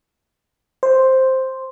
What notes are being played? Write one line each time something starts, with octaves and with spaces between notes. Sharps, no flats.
C5